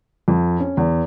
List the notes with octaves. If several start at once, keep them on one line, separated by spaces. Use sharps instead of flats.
F2
C#4
E2